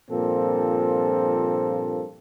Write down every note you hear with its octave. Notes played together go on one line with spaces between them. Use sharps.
G2 A#2 F3 A#3 C4 A4